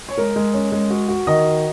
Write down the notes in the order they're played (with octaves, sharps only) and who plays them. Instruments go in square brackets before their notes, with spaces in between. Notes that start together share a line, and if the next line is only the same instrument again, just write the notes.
[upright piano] C#5
[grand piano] G#3 [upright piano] A#4
[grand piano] G#3
C#4
G#3
F#4
F#4
[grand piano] D#3 [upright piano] D#5
[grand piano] F#4